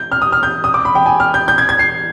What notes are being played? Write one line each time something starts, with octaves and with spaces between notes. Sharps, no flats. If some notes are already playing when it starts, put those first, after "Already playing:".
Already playing: G6
F6
D#6
F6
G6
D#6
D6
B5
G5
G#5
F6
G6
G6
G#6
G#6
C7